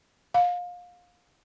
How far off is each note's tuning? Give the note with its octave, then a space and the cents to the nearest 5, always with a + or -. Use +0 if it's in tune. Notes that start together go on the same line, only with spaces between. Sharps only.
F5 +25